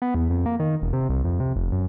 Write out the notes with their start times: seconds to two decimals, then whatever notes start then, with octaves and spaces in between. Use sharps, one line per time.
0.02 B3
0.15 E2
0.30 F2
0.46 A#3
0.59 D#3
0.82 E1
0.93 C3
1.09 C2
1.24 F2
1.40 C3
1.56 F1
1.72 F#2